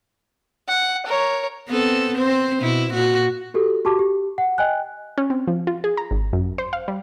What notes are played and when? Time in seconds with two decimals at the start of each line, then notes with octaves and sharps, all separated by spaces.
0.68 F#5
1.06 A#4 C#5
1.69 B3 C4 A4
2.15 C4 C5
2.59 B2 E4
2.92 A#2 F#4
3.54 F#4 G4 A4
3.85 F#4 G4 A5 D6
3.99 G4
4.38 F#5
4.58 D#5 G5 G#5 F#6
5.18 C#4
5.30 C4
5.47 F3
5.67 F4
5.84 G#4
5.97 A#5
6.11 G#1
6.33 F#2
6.58 C5
6.73 F5
6.88 G3